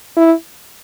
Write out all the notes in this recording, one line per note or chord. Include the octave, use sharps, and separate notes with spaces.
E4